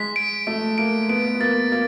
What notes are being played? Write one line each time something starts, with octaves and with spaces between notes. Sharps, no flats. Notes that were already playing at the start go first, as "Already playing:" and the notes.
Already playing: G#3 B6
D7
A3 D7
A#3 D7
B3 D7
B3
A#3 A6
A#3 A6